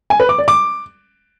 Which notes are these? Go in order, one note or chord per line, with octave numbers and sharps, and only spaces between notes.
G#5
B4
D6
D5
D6